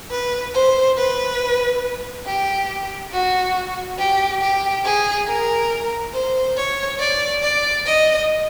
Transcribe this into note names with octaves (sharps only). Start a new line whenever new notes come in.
B4
C5
B4
G4
F#4
G4
G4
G#4
A#4
C5
C#5
D5
D5
D#5